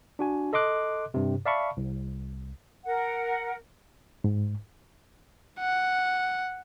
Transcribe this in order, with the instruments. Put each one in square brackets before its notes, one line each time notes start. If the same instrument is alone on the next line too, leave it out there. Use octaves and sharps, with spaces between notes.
[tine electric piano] D4 F#4 G#5
A4 D#5 C6 D6 F#6
G2 C3
D5 E5 F5 A5 B5 C#6
C2
[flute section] A#4 F#5
[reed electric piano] G#2
[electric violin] F#5